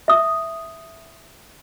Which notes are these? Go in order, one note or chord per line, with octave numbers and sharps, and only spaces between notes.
E5 D#6